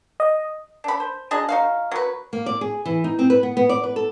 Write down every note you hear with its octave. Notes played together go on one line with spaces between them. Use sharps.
D#5
D4 B5
C5
F#3 D4 G#4 D#5
D#4 F#4 F5
F#3 B4
A#3
D5
G#4
E3
D#4
C4
B4
B3
B3
D5
B4
A4